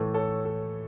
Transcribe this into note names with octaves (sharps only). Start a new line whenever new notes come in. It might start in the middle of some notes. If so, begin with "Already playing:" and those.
Already playing: A2 E3 A3 A4
A4 C#5
A4